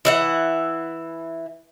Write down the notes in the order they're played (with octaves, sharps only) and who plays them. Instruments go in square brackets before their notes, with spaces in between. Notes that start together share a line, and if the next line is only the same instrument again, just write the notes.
[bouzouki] E3 E5 F#5